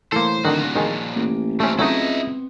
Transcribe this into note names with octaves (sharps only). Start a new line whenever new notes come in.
A2 E3 A#3 A4 C5
D1 A#2 D3 D#3 F#4
D#3 F3 G#3 C#5 A5
A1 A#3
G2 A3 C4 C#4
C#2 F#3 A3 B3 C4 D#4 E4 D#5